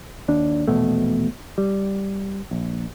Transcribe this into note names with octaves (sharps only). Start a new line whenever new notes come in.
D#2 D4
A#1 E2 B2 A3
G3
A#1